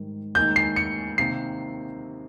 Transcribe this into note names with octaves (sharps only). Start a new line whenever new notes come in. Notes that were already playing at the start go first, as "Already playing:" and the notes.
Already playing: G#2 D#3 G3
D#2 D#3 G#3 D#4 G6
C7
C#7
C3 D#3 A#3 C7